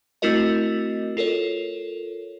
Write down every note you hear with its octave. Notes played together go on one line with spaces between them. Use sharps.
A3 C4 E4 F#4 A#4 D#5
F4 A4 A#4 C#5